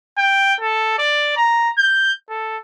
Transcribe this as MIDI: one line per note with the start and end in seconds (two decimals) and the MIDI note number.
0.18 0.55 79
0.61 0.94 69
0.99 1.36 74
1.37 1.70 82
1.78 2.12 91
2.29 2.58 69